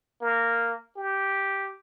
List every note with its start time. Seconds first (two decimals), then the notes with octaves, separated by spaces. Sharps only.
0.21 A#3
0.97 G4